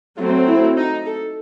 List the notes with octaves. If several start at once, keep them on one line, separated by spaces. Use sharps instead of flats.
F#3 A3 C4 F4
E4
D#4
A4